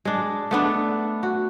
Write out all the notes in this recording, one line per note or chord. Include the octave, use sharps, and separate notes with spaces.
G#3 D4
A3 B3 D4
F#4